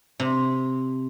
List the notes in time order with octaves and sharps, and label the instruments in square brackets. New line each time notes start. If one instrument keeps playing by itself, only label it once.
[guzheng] C3